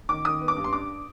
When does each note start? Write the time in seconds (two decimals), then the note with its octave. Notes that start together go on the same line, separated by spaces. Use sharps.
0.09 D#3 D6
0.25 D#3 D#6
0.41 B3
0.48 D6
0.56 G2
0.64 C6
0.73 D4 D6